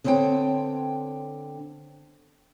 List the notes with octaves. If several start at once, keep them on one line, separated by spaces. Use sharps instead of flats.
D3 B3 C4 C5 C#5 G5